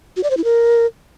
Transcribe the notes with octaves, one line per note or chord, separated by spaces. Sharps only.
F#4
D5
C5
E4
A#4